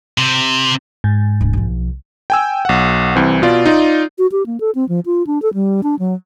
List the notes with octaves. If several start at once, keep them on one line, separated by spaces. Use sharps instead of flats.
C3
G#2
D1 C2
B1 F3
G5 G#5 E6
B1 F#5
C2 E3 C4
B2 F4 D5
D#4 F4 D5
F#4
G4
A#3
A4
C4
F3
F4
D4
A4
G3
D4
F#3